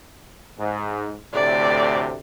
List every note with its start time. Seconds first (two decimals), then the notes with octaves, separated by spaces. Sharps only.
0.58 G#2
1.34 D2 A2 C3 D5